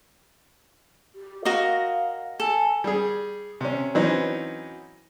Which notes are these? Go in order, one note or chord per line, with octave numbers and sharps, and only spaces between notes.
G4
F#4 A#4 D#5 F5
A4 G#5
G3 G#4
C3 C#4
E3 F#3 C4 C#4 D#4